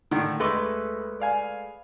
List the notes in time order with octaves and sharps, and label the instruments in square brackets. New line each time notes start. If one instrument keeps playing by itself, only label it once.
[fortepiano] A2 D3 [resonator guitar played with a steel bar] D#3
[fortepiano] D2 D6 [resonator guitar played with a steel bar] G#3 A3 B4
[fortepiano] D5 F5 G#5